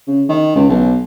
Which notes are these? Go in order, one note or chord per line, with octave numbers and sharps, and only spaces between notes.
C#3
D#3
C#2
B1